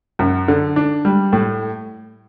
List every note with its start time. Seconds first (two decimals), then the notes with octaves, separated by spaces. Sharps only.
0.19 F#2
0.48 D3
0.76 D4
1.05 G3
1.33 A2